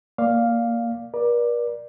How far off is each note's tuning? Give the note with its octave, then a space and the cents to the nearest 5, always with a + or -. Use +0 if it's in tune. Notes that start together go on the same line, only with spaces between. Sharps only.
A#3 +0 D5 +0 F5 +0
A#4 +45 D5 +10